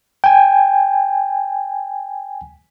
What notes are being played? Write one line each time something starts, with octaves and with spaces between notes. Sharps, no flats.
G5 G#5